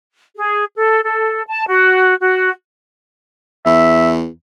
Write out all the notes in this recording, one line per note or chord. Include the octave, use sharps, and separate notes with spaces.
G#4
A4
A4
A5
F#4
F#4
E2 E5